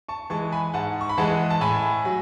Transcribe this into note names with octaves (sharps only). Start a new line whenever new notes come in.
A5 C#6
E3 G#3 A5 C#6
G#5 B5
G#2 F#5 A5
C#6
B5
E3 G#3 F#5 A5
A5
A2 G#5 B5
F#3